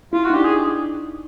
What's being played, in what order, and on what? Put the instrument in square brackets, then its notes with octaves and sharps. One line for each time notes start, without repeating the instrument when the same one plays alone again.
[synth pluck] E4 [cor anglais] F4
[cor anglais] F#4
[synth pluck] D#4
[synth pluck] D4 [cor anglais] G4
[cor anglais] G#4